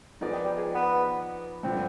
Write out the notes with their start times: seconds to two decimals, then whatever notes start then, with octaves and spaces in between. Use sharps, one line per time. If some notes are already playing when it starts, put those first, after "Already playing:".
0.21 D3 F3 B3 D#4 G#4 D5
0.33 D#3
0.45 G3
0.57 G#3
0.74 B3
1.63 G2 D3 F3 C4